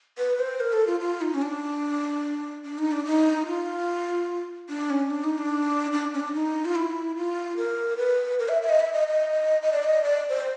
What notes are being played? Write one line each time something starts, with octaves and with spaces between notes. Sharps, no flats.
B4
C5
A#4
A4
F4
F4
D#4
C#4
D4
D4
D#4
D4
D#4
F4
D4
C#4
D4
D#4
D4
D4
C#4
D4
D#4
F4
E4
F4
A#4
B4
A#4
E5
E5
D#5
E5
D#5
D#5
D#5
D5
D#5
D5
C5